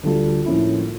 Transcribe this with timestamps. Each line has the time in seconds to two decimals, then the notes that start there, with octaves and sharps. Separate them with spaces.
0.03 D2 D3 G3 D4 F4
0.46 A2 F3 A#3 C#4 E4